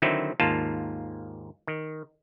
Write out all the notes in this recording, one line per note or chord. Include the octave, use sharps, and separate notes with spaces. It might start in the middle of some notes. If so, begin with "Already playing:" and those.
D3 D#3 F#3 C4 D#4 E4
D#2 G#2 A#3 F4 A5
D#3